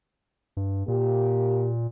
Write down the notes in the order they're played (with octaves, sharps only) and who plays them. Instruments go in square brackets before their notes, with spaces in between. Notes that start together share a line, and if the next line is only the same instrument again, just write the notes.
[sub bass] G2
[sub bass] A#2 [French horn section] A#3 G4